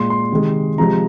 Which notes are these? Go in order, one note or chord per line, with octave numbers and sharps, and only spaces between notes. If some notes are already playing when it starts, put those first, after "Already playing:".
Already playing: A#2 G#3 C6
C6
C3 D#3 G#3
C3 F3 G#3 A#5